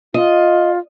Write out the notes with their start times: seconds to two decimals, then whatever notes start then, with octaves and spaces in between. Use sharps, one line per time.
0.14 F4 D#5